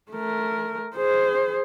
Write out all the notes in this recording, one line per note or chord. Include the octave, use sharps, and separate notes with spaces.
A3 A#4
G#4 C5